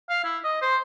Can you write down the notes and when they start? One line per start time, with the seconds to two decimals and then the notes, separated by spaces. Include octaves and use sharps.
0.10 F5
0.24 E4
0.44 D#5
0.62 C5